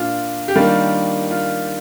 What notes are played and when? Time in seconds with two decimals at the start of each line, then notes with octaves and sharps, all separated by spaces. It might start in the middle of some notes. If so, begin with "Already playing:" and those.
Already playing: A#2 D4 F4
0.48 G4
0.55 D#3 G3 A#3 D4 F4
1.31 F4